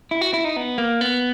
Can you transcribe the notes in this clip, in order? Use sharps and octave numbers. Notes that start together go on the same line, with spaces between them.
E4
F#4
E4
D#4
B3
A#3
B3